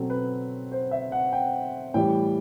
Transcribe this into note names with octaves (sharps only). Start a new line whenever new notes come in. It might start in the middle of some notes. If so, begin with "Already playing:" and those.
Already playing: B2 F#3 C4 A4
B4
C5
E5
F#5
G5
A2 E3 G3 G5